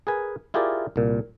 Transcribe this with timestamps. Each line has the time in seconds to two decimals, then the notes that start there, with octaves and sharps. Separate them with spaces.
0.07 G#4 A#4 B4 G#5
0.54 E4 F4 G4 G#4 A#4 D5
0.96 C2 A#2